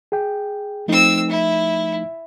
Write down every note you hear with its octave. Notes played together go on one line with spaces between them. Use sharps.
G#4 G5
F3 A3 C4 D#4 E6
E4